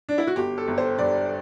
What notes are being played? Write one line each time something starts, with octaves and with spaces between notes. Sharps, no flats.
D4
E4
F#4
G1 G4
A4
G1
C5
G2 D5